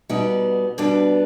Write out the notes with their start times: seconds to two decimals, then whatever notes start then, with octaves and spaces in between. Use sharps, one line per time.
0.09 B2 G3 B3 D#4
0.78 B2 G3 B3 D4